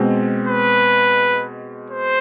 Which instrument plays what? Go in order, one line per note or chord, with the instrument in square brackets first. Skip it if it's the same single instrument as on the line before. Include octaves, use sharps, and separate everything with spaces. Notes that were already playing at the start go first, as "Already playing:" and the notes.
Already playing: [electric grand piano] B2 G#3 C4
[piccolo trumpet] B4
C5